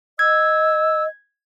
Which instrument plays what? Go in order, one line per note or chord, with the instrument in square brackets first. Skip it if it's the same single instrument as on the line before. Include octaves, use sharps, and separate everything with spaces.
[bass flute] D#5 [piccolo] E6 [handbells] G#6